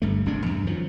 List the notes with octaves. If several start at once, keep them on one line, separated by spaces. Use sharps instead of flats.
G1 G2 A3
F#1 G2 C3 D4
E2 G2
F#2 D#3 F3 F#3